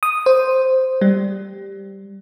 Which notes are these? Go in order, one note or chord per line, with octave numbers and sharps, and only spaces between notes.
D#6
C5
G3